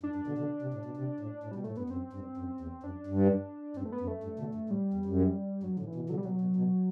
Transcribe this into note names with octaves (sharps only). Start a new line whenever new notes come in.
G2 D4
G2
B2 D3
B2 D3
C3
A2
B2
C3
A2
A2
B2 G3
A2 A3
G2 B3
F#2 C4
G2
F#2
E2
F#2 D4
G2
G2 C4
A3
B3
F#2
A3
G2
B2 D3
G2
A2 G3
E2
F#2
G2 F#3
A2 D3
E3
B2
B2 D3 F#3
G3
B2 F#3
B2
B2